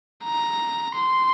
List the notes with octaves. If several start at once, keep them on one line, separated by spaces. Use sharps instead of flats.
A#5
C6